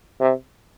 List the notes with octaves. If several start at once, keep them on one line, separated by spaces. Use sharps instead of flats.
C3